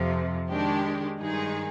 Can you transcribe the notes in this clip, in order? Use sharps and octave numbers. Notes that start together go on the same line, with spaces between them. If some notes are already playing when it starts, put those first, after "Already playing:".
Already playing: F2 C3 F3
D#3 G#3 D4 G4
G2 D#3 G#3 D#4 G#4